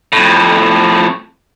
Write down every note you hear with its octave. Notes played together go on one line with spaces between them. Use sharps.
F2 A2